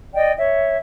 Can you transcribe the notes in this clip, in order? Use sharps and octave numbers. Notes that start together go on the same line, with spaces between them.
D5 D#5 G5
C#5 E5